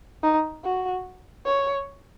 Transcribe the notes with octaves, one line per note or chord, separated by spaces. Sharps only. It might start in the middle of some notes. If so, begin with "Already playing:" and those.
D#4
F#4
C#5